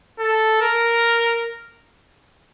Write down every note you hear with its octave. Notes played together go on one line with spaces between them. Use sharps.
A4
A#4